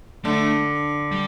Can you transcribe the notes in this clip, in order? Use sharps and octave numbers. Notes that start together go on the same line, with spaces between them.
D3 A3
G3